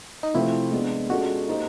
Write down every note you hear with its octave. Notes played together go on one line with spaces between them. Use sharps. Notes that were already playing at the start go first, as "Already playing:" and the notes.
D#4
C3 F3 A3 C4 E4
G#3 B3 D4
G#3 C#4 F4 F#4 A4 D5
A#3 D#4 G4 C5 D#5